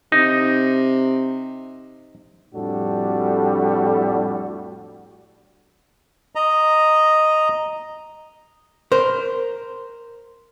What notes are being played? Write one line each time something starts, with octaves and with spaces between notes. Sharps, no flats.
C3 D#4
F2 A2 G3 D4 F#4 A4
D#5 A#5
A#4 C5